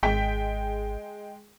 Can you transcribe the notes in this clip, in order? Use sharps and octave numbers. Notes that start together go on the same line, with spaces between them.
G#1 G#3 G5 B6